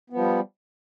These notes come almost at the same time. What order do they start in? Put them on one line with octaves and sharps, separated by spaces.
B3 F3 G3